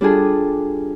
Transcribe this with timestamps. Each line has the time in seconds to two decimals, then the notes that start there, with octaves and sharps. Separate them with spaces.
0.01 G3 D4 F4 G#4 A4